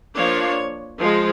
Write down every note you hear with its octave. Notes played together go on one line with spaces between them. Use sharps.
F3 A#3 D4 C#5
F3 G#3